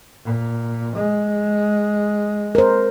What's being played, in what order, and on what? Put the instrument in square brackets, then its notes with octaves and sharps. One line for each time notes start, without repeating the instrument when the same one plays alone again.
[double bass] A#2
G#3
[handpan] A#4 C5